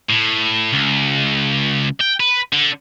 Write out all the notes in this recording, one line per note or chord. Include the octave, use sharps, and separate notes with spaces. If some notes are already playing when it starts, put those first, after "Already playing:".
A2
C#2
G5
B4
D3